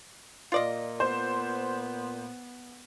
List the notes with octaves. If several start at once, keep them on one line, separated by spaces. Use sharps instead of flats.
A#2 F4 D5 D#5
B3 C5